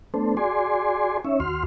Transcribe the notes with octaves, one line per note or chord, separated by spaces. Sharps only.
A3 B3 D4 A4 C5
F#4 G#4 D5 G#5 C6
C#4 D#4 C#5 E5
D#2 F#4 C6 F6